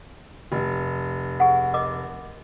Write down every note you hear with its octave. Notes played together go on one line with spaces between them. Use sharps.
F1
G#4 F#5
A#4 D#5 D6